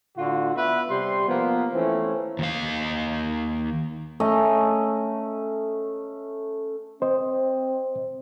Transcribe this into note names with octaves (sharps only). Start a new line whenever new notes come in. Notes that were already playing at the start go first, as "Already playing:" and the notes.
A2 D3 F4 F#4
B3 B4 E5
C3 G3 C6
F3 A#3 B3
E3 A3 C4 C#4
D#2 F5
A3 C#4 D#5 A#5
C4 C5 D#5